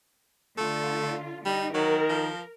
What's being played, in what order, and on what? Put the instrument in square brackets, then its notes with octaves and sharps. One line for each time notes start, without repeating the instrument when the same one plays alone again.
[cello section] D3 F4 [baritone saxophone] A3
[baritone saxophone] G3 [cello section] D#4
[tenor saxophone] D#3 [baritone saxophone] F#3 [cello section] A#4
[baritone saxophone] F3